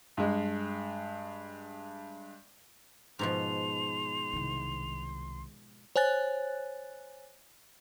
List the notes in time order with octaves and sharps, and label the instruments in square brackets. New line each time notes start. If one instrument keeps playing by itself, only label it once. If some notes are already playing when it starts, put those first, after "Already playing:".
[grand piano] G2 G#3
[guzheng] G#2 B2 F3 [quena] C6 [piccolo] F7
[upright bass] C2 D#3
[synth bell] C5 C#5 G#5 F#6 A6